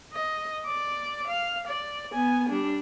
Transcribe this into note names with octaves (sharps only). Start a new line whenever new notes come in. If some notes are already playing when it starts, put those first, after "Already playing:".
D#5
D5 D6
F5
D5
B3 G#5
G3 D4